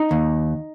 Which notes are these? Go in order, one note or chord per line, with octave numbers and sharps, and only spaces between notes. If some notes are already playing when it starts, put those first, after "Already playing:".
Already playing: D#4
D#2